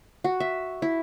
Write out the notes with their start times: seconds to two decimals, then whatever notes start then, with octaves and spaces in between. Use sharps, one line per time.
0.24 F#4
0.40 E5
0.82 E4